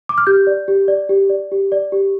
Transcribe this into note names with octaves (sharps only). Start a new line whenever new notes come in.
D6
F6
G4 G6
D5
G4
D5
G4
D5
G4
D5
G4